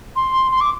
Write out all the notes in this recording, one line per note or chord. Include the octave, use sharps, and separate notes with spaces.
C6
C6
D6